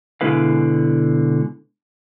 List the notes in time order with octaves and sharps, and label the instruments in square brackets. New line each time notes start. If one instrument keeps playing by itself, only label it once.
[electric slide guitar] B2 D3 G#3 E4 B4 F5